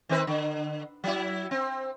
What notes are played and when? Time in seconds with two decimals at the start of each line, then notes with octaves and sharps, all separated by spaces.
0.09 D#3 C4 B4
0.27 D3
1.04 F#3 E4
1.51 C4